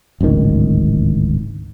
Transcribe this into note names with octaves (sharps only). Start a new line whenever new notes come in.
D1 G#1 C#2 D#3